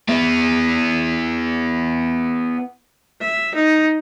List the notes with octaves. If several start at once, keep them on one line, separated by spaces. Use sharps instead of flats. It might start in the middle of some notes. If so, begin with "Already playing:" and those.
B3 E4
E5
D#4